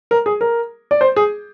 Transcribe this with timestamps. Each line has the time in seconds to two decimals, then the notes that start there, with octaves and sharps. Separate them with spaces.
0.11 A#4
0.26 G#4
0.41 A#4
0.91 D5
1.01 C5
1.16 G#4